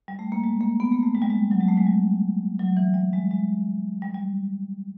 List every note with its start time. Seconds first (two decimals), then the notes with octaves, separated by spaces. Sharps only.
0.08 G3
0.19 A3
0.32 A#3
0.44 G#3
0.61 A#3
0.80 B3
0.92 A#3
1.03 A3
1.15 G#3
1.22 G3
1.30 G#3
1.51 F#3
1.60 G#3
1.69 A3
1.78 G#3
1.87 G3
2.60 F#3
2.77 E3
2.94 G3
3.13 G#3
3.31 G#3
4.02 G3
4.15 G3